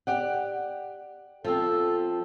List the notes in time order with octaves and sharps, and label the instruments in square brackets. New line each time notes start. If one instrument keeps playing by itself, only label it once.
[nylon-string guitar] G4 D5 F#5
[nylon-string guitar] F3 C4 [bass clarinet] A4